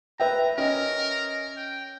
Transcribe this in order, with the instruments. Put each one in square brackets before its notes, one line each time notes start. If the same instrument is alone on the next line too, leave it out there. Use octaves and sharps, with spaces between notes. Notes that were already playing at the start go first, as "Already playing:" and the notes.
[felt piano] B4 E5 G5 [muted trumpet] A#5
[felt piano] C#4 D#5 [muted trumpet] A#4
[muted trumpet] G5